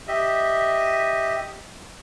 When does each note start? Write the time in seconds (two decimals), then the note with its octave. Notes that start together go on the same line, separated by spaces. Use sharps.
0.08 G4 D#5 E5